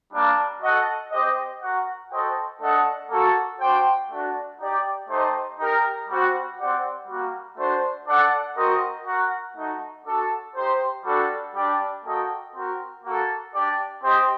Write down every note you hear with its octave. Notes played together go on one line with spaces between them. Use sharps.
G3 A#3 D4
F#4 A4 D#5 F#5
C4 G4 C5 D#5
F#4 A#4 F#5
F#4 A4 C5 D#5 G5
A3 D4 A4 D#5 F#5
A#3 F#4 A4
D4 F#4 C5 G5
A3 D4 F#4
D#4 G4 D5 G5
A3 D#4 G4 C5 D#5
D#4 G4 A#4
G3 C4 F#4
C4 G4 D5 F#5
G3 A#3 F#4
A3 D4 F#4 C5
D4 A4 D5 F#5
C4 F#4 A#4 D#5
F#4 A#4 F#5
A3 D#4 F#4
D4 F#4 A4
D#4 G4 C5
G3 D4 F#4 A4
G3 D4 G4 D5 G5
A#3 F#4 A4 D#5 G5
C4 F#4 A#4
A#3 F#4 A4
D4 G4 D5
C4 G4 C5 D#5 G5